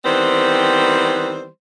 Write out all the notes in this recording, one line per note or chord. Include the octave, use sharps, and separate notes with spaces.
D#3 E3 G3 B3 C4 C5